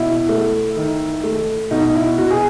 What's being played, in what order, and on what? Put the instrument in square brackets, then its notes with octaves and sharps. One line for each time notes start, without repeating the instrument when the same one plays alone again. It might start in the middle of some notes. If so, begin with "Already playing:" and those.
Already playing: [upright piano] B2 E4
A3
D#3
A3
B2 D#4
E4
B2 F#4
G#4